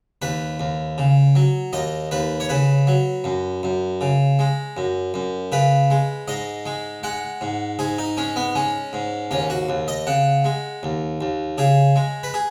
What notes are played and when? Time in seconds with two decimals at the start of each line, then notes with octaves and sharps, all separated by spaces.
0.22 D#2 B4
0.60 D#2
0.98 C#3
1.36 F#3
1.73 D#2 D#5
2.11 D#2 B4
2.40 C#5
2.49 C#3 B4
2.87 F#3
3.24 F#2
3.63 F#2
4.01 C#3
4.39 G#3
4.77 F#2
5.14 F#2
5.52 C#3 B4
5.90 G#3
6.28 G#2 D#5
6.66 G#3
7.03 G#3 F#5
7.41 G#2
7.79 G#2 G#4
7.98 D#4
8.17 G#3 C#4
8.36 B3
8.55 G#3 C#4
8.93 G#2
9.31 D#2 C#4
9.50 F#4
9.69 D#2
9.88 D#5
10.07 C#3 F#5
10.45 G#3
10.83 D#2
11.21 D#2
11.58 C#3 G#4
11.96 G#3
12.23 B4
12.34 G#4